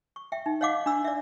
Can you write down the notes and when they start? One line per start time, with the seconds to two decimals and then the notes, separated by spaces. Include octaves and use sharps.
0.16 C#6
0.32 E5 G5
0.46 D#4
0.61 C#5 D#5 F5 F#5 D6
0.86 D4 D#5 B5 E6
1.04 D5 E5